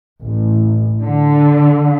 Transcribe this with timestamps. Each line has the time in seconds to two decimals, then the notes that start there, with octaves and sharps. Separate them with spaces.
0.24 A1
1.02 D3